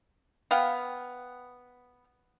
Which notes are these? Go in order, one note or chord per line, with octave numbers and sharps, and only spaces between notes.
B3 F5 G5